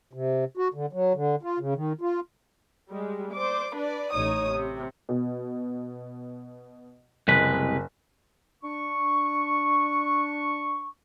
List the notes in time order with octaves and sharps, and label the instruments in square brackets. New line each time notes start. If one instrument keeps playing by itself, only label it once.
[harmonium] C3
F#4
D3
F#3
D3
F4
C#3
D#3
F4
[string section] G3 G#3
C5 D5 D6
D4 B4 D5
A1 D#4 C#5 D#6
C3
[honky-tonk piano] B2
[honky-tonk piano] F#1 B6 [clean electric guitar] C2 G#3 B4
[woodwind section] D4 C#6